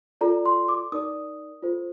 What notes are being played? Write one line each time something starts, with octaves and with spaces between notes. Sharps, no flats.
F4 A4 D5 A#5
C6
D6
D#4 A#4 D5 D#6
F4 A4 C5